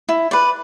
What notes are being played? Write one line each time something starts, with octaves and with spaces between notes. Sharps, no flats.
E4
B4 D5